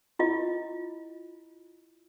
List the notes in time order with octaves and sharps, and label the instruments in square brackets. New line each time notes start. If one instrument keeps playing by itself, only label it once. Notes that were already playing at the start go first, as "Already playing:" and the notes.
[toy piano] E4 F4 D#5